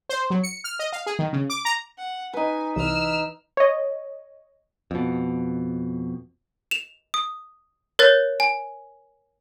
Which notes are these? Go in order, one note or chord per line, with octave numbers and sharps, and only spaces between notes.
C5
F#3
C#7
F6
D#5
F5
G#4
D#3
C#3
D6
A#5
F#5
D#4 B4 G#5
C2 E3 E6 F6
C#5 D#5
F2 B2
E7 F7
D#6
A#4 C#5 F#6 G6 A6
G#5